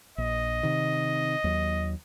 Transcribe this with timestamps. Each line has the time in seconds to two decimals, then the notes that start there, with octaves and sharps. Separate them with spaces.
0.18 A#1 D#5
0.63 C3 D#3
1.44 D#2 F#3